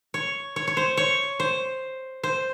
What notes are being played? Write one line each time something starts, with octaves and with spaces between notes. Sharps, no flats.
C#5
C#5
C#5
C5
C#5
C5
C5